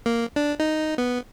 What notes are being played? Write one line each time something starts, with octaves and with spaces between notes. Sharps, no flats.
A#3
D4
D#4
B3